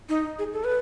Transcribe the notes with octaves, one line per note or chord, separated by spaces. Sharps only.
D#4
G#4
A4
B4